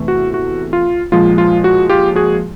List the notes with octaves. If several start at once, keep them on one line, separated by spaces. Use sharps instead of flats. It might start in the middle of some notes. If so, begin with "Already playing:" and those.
Already playing: E2 C3 E3 A3
F#4
F#4
F4
A#2 F3 G#3 F4
F4
F#4
F4 G4
F#4 G#4